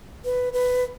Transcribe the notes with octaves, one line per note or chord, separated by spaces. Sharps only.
B4
B4